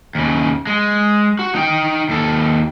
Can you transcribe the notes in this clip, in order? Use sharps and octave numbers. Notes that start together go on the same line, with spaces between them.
D#2 C#3
G#3
F#4
D#4 G5
D#2 A4